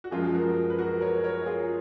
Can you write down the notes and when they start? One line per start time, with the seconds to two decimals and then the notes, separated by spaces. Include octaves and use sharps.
0.04 F#4
0.11 F#2 F3 G#3 F4 G#4
0.34 F#4 A#4
0.70 B4
0.78 F#4 A#4
1.01 A#4 C#5
1.24 A#4 C#5
1.46 F4 G#4